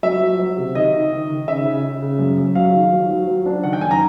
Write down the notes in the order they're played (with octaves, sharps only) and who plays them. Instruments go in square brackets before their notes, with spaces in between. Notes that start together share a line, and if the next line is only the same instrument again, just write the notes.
[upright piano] F#3 E5
F#3
F#3
C3
D#3 D#5
D#3
D#3
D#3
C#3 E5
C#3
C#3
C#3
F#2
F#2
F#3 F5
D#3
F#3
F#3
F#3
D4
D#3 F#5
G5
F#2 G#5
A#5